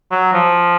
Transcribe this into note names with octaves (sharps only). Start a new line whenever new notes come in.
F#3
F3